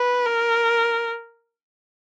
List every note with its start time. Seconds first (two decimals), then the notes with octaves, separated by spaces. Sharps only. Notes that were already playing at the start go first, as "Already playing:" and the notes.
Already playing: B4
0.27 A#4